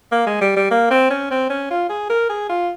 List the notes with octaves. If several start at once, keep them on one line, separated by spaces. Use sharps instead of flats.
A#3
G#3
G3
G3
A#3
C4
C#4
C4
C#4
F4
G#4
A#4
G#4
F4